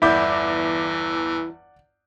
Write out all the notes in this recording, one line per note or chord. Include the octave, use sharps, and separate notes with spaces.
G1 E2 E3 E4 D5 F#5 D6 G6